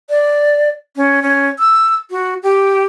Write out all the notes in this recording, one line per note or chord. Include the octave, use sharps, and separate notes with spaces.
D5
C#4
C#4
E6
F#4
G4